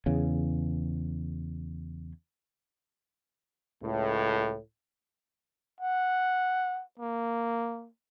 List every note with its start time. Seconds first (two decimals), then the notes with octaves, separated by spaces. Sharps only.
0.06 E2 C#3
3.83 C#2 A2
5.81 F#5
6.99 A#3